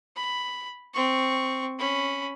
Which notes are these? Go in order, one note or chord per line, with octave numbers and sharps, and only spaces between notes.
B5
C4 C#6
C#4 B5